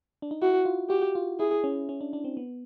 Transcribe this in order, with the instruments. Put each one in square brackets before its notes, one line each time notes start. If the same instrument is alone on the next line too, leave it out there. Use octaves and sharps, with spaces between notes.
[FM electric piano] D4
D#4
[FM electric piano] E4 [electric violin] F#4
[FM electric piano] F4
[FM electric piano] F#4 [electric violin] G4
[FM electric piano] F4
[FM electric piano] E4 [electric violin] G#4
[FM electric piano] C#4
C#4
D4
D4
C4
B3